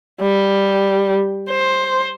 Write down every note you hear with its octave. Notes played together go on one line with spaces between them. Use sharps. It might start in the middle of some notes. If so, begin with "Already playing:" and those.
G3
C5